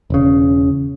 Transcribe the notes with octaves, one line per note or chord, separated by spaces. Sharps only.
E1 C#3